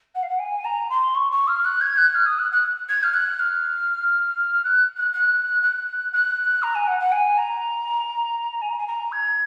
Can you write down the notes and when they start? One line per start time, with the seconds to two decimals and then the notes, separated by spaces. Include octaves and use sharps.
0.15 F#5
0.22 F5
0.29 F#5
0.39 G#5
0.64 A#5
0.89 C6
1.14 C#6
1.31 C#6
1.47 F6
1.64 F#6
1.81 G#6
1.97 F#6
2.14 F6
2.26 D#6
2.38 F#6
2.52 F#6
2.88 G#6
3.03 F6
3.13 F#6
3.39 F6
4.64 F#6
4.96 F#6
5.13 F#6
5.62 F#6
6.12 F#6
6.62 A#5
6.75 G#5
6.87 F#5
7.00 F#5
7.12 G#5
7.37 A#5
8.61 G#5
8.69 A#5
8.78 G#5
8.87 A#5
9.12 G#6